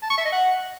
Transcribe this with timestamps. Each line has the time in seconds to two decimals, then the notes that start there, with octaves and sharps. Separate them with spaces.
0.03 A5
0.10 C#6
0.18 E5
0.25 D#5
0.33 F#5